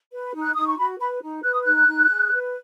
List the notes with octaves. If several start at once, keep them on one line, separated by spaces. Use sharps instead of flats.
B4
D#4
F#6
D#4 D#6
C#6
F#4 B5
B4 B5
D#4
B4 F#6
D#6
D#4 F#6
D#4
G#4
B4